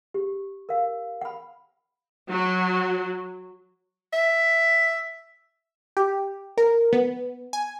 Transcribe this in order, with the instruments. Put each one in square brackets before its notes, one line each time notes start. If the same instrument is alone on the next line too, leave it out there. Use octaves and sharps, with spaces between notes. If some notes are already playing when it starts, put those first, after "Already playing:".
[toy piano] G4
A#4 F5
F#5 B5
[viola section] F#3
[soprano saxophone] E5
[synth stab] G4
A#4
B3
G#5